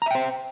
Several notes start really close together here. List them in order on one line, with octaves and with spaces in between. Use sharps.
A#5 E5 G5 C5